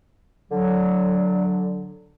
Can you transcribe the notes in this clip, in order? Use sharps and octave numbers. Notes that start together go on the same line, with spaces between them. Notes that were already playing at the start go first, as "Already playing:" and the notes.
D3 F#3